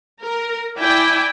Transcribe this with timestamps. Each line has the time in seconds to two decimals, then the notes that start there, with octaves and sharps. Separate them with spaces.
0.23 A#4
0.80 E4 D5 G5 G#5